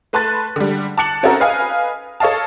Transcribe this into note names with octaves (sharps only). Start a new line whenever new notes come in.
A3 B4 A5 C6 F#6 A6
D3 G3
A5 D6 F#6 C#7 F#7
C4 C#4 D#4 F#4 A4 A#4
B4 D#5 F5 G#5
A4 C#5 D#5 F5 A5